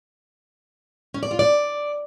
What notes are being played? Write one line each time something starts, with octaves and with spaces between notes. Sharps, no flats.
C#4
D5
F4
D5